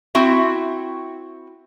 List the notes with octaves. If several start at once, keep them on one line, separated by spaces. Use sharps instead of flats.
C4 E4 F#4 E5